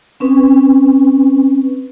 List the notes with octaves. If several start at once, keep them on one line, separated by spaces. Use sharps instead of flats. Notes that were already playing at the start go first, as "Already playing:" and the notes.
C4 C#4 B4